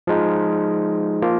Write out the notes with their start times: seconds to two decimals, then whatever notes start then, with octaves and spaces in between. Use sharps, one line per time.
0.07 F3 G#3 D#4
1.22 F3 A#3 F4